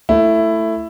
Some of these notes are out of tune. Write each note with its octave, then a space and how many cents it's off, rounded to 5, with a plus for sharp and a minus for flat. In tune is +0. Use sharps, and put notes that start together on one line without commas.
A3 +10 E4 +10